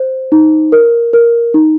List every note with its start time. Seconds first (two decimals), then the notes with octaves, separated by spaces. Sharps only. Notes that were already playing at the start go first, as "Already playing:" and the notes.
Already playing: C5
0.32 D#4
0.72 A#4
1.13 A#4
1.54 D#4